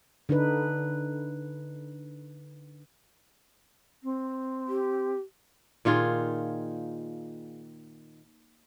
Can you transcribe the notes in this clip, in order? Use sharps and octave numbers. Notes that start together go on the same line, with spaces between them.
D3 D4 D#4 B4
C4
G4
A#2 D#3 F4 G#4